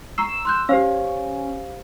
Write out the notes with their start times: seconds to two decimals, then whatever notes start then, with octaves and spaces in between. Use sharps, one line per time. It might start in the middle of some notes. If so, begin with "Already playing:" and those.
0.18 A#5 C#6 E6 C7
0.45 C6 F#6 G6
0.69 C#4 G4 C5 F5